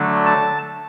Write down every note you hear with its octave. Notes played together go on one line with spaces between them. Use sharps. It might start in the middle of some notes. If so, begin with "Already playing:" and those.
Already playing: D3 F#3 A3 D4
A5